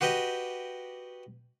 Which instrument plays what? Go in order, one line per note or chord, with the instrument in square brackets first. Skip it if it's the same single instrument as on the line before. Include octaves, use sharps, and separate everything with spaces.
[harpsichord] F#4 G4 B4 D#5 G5